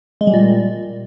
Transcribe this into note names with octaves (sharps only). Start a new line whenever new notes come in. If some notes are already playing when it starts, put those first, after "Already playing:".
G#3
G3
A#2